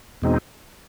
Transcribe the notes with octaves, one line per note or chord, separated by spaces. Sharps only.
E2 B2 G#3 C4 D#4